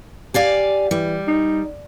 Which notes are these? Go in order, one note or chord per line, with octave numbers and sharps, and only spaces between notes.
G4 D5 F5 G#5
E3 G3
D#4